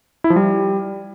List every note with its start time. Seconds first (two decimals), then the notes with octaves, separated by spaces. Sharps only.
0.24 E4
0.30 F3
0.36 G3